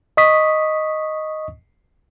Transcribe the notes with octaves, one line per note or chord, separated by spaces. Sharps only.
D#5 C#6 D#6 B6